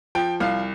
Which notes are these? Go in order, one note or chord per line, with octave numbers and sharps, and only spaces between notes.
F3 G5
C2 F5